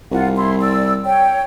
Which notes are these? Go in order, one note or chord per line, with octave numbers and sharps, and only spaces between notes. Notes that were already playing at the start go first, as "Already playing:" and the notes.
C2 F4 F#5
E4 C6
D5 E6
C#5 G5